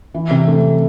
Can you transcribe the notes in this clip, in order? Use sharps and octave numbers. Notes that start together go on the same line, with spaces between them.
E3
C3
A3